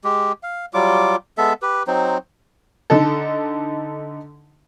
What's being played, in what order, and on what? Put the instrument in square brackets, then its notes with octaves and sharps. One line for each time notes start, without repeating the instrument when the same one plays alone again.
[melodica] G#3 G4
F5
F#3 G3 F4 D6
G#3 B3 A4 E5
G4 B4
F#3 C4 D#4 C5
[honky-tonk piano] D3 D#4 A4